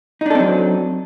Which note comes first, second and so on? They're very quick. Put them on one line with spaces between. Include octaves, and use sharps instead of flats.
D#4 D4 A4 C4 F#3